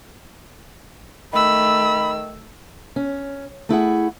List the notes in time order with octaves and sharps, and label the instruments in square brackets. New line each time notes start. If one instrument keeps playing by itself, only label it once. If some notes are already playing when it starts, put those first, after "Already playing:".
[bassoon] D#3 [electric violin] A3 E6 [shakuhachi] B5
[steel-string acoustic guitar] C#4
A3 E4 G#4 F#5